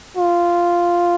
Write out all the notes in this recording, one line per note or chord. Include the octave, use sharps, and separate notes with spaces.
F4